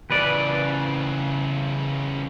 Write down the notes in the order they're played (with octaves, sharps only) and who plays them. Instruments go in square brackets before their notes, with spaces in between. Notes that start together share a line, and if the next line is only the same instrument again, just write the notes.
[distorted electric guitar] C#3 E3 [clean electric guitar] B4 D5